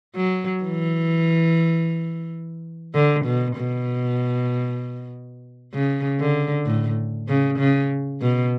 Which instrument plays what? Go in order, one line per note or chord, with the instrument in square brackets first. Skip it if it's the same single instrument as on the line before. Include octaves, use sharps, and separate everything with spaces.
[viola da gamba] F#3
E3
D3
B2
B2
C#3
D3
A2
C#3
C#3
B2